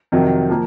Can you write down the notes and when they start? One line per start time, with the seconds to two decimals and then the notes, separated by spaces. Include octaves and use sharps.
0.12 F2 C3 D#3 F#3
0.49 F3 A#3